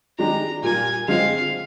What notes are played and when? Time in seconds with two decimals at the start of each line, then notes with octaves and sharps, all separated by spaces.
0.19 D#3 G#3 D4 G4 A#5
0.63 A#2 G3 A#3 F4 G#5
1.08 D3 G#3 C4 F4 F5